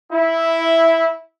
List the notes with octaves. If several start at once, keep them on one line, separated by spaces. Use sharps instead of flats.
E4